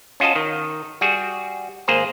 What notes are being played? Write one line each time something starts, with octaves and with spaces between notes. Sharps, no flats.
C#4 F4 F#4 D#5 A5
D#3
G3 F#4 G#4
G#1 A#3 G#4 C5 A#5